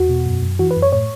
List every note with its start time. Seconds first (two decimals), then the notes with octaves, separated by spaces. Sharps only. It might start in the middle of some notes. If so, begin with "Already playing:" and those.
Already playing: E2 F#4
0.09 B2
0.26 F#2
0.42 F#2
0.59 E3 F#4
0.71 B4
0.77 F#2
0.82 C#5
0.92 A2 C#5